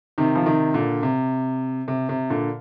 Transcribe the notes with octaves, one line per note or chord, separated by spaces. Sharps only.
C3 D#3
F3
C3 D#3
A#2 D3
C3
C3
C3
A#2 D3